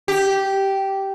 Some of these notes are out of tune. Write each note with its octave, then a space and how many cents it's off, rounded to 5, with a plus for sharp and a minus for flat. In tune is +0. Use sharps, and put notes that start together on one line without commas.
G4 -10